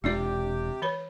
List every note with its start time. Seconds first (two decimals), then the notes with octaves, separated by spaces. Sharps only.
0.04 E1 C3 G#3 D4 F4 G4 D5
0.82 E3 B4 C#5